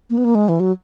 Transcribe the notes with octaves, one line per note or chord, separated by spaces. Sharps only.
A#3
B3
A#3
G#3
E3
F#3